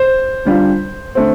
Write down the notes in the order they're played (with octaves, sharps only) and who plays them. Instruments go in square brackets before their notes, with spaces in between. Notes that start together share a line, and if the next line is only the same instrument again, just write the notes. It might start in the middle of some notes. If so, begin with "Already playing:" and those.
Already playing: [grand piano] C5
[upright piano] D3 G3 D4 F4
D3 A3 C4